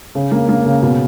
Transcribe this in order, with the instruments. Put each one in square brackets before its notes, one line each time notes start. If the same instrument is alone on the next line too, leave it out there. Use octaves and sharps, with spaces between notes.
[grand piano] C#3
A#3
A#3
C#3
B2